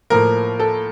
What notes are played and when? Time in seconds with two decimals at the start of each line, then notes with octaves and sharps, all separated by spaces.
0.10 A2 F3 A#3 A#4
0.59 A4